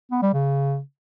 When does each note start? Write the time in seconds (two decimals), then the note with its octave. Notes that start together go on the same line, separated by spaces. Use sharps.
0.11 B3
0.22 G3
0.33 C#3